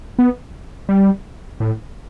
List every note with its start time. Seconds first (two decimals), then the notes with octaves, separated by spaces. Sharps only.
0.19 B3
0.89 G3
1.60 A2